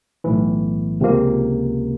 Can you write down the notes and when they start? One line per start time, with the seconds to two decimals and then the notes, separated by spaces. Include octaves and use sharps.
0.24 B1 A2 E3
1.00 C#2 C3 F3 A#3